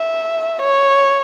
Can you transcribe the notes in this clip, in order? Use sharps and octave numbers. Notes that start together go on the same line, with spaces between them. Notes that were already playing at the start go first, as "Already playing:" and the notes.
Already playing: E5
C#5